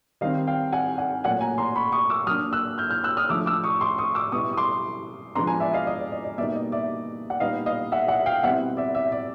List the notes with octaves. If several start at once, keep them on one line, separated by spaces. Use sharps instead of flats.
D#3 G3 C4 D#4 D#5 F5
F5 G5
F#5 G#5
F#5 G#5
A#2 F#3 A3 C#4 F#5 G#5
G#5 A#5
A#5 C6
B5 C#6
C#6 D#6
D6 E6
F#3 A#3 D4 D#6 F6
E6 F#6
F6 G6
F6 G6
E6 F#6
D#6 F6
F3 A3 D4 D6 E6
D6 E6
C#6 D#6
C6 D6
C#6 D#6
D6 E6
B2 G3 B3 E4 C#6 D#6
D#6
C6 D6
F3 G#3 B3 D4 A#5 C6
G#5 A#5
D5 E5
D#5 F5
D#5
D5
D#5
D#5
B2 G3 A#3 D#4 D5 E5
D#5
D5 E5
F#5
A#2 G3 B3 D#4 D#5 F5
D#5 F5
E5 F#5
E5 F#5
F5 G5
B2 G3 C4 E4 E5 F#5
D5 E5
D5 E5
D5